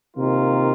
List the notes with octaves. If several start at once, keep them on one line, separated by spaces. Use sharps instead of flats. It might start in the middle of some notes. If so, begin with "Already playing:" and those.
C3 D#3 A#3 F4